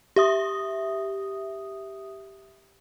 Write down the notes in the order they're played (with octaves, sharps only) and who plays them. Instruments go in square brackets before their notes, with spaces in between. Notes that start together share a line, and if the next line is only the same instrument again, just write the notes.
[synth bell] G4 E5 D#6